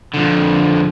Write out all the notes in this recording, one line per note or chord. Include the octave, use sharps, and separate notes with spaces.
F2 D3